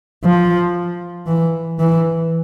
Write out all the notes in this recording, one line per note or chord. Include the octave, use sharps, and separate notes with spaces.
F3
E3
E3